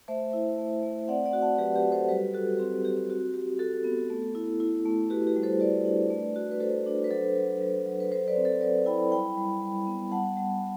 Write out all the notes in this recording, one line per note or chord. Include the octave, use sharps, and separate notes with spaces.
A3 C5 E5
E4
A3
A3
C4 D5 F#5
D5 F#5
F#4
F#5 A5
F#3 G4 B4
G4 B4
F#4
A4 C5
G3 G4 B4
F#4 A4
C4 G4
C4 G4
F#4
F#4 G4
F#4 A4
B3
A3
E4
E4
A3
F#4 G4 B4
G4 B4
G3
A4 C5
F#4 B4 D5
D4
A3
F#4
B4
F#4 A4 C5
D4
B4
F#3 A4 C5
F#3
F#3
F#3
B4
F#3 A4 C5
B4 D5
C4
A4 C5
F#3 B4 D5
E4 G5 B5
G3 G5 B5
G3
G3
B3
G3 F#5 A5
G3